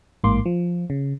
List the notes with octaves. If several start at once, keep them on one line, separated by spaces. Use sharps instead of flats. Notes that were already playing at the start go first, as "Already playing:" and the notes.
A1 G#2 A#3 C6 D6
F3
C#3